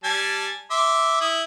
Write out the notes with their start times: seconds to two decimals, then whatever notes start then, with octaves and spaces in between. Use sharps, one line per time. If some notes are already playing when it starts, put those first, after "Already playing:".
0.04 G3 G#5 A5
0.71 E5 C6 D6
1.21 E4 D#6